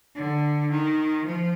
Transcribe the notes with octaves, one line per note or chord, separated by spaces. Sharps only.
D3
D#3
F3